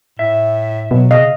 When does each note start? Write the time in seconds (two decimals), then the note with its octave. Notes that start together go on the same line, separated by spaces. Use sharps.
0.19 A2 E5
0.91 B2 F#3
1.11 C#3 D#5 F5